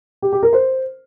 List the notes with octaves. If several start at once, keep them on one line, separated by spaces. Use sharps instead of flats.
G4
G4
A#4
C5